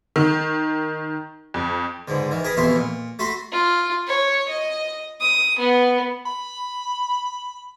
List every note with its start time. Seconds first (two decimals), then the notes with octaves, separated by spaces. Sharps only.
0.16 D#3
1.54 F2
2.08 C#2 G#2 D3
2.31 D#3 E3
2.44 G#4 A#4 B4
2.57 A1 F2 B2 E3 E5 C6
2.76 A#2
3.19 A3 F#4 B5 C6
3.52 F4
4.08 C#5
4.49 D#5
5.21 D#6
5.59 B3
6.26 B5